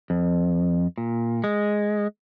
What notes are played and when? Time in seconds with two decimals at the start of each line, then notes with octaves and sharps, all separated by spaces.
0.10 F2
0.98 A#2
1.44 G#3